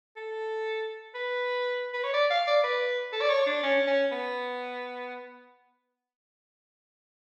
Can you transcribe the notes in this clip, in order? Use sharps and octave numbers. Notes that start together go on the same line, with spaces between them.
A4
B4
B4
C#5
D5
F5
D5
B4
A4
D5
C#5
D4
C#4
C#4
B3